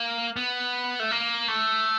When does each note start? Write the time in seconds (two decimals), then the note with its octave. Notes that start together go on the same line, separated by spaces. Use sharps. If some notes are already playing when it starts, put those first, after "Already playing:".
Already playing: A#3
0.36 B3
1.00 A3
1.11 A#3
1.48 A3